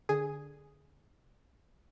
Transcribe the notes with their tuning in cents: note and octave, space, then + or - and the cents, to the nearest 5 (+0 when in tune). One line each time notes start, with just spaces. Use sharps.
D3 +0 G#4 +0